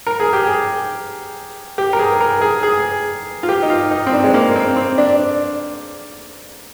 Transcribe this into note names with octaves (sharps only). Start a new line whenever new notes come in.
A#4
G#4
G4
G#4
G4
A#4
G#4
A#4
G#4
G#4
F4
G4
D#4
F4
D#4
C4
D4
G#3
A#3
C4
C4
D4